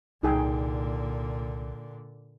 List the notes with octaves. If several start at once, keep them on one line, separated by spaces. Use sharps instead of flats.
C2 A#2 D3 D#4 G#4 G5